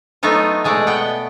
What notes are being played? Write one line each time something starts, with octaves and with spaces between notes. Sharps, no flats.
F#3 A3 B3 D#4 F4
B2 G#3 A3 D5
B3 F#5 G5